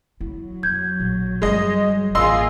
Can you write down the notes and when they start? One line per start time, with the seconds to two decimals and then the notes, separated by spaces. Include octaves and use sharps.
0.21 F#3 E4
0.63 F2 G6 G#6
1.00 A#1
1.42 G1 G3 G#3 D#5
2.15 A1 A#3 F4 G#4 D#5 C6 E6